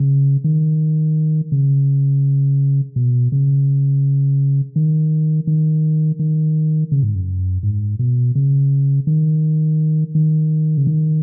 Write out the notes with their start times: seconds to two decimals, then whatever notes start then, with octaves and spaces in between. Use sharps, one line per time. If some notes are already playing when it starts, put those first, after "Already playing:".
Already playing: C#3
0.44 D#3
1.52 C#3
2.96 B2
3.32 C#3
4.76 D#3
5.47 D#3
6.19 D#3
6.92 C#3
7.03 G#2
7.15 F#2
7.63 G#2
7.99 B2
8.35 C#3
9.07 D#3
10.15 D#3
10.77 C#3
10.87 D#3